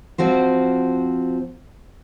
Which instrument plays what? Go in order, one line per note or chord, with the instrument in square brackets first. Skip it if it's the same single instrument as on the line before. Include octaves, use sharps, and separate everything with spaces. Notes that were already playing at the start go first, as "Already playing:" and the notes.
[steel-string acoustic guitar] F3 C4 F#4 C5